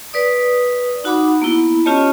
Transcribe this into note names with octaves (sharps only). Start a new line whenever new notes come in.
B4 D5 D#6
D#4 F#4 F#5 B5 D6
A#3 B3 E4
C#4 F4 G4 C#5 D#5 A5